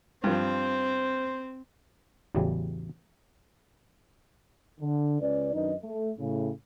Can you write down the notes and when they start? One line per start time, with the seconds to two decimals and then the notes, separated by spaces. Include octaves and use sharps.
0.24 G2 F3 C4 C5
2.35 A1 E2 C#3 E3 F#3 G3
4.81 D3
5.21 C#2 C#4 B4 D5
5.54 F#2 D#3 D4 D#4 B4 D#5
5.83 A3
6.19 A2 C#3